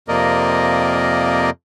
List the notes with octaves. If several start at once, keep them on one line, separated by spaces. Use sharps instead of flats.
F2 C3 A#3 A#4 D5 D#5